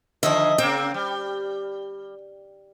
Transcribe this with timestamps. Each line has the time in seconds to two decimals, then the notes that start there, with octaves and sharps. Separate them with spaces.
0.23 D3 D#3 F3 D#5 E5
0.58 C#3 A#3 C4 G5
0.94 G3